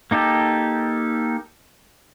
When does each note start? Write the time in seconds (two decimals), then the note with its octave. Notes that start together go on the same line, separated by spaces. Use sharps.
0.11 A#3 D#4 G4 A4